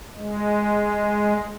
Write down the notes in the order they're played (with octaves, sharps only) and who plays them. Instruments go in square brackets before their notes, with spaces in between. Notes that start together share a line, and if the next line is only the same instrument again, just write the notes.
[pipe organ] G#3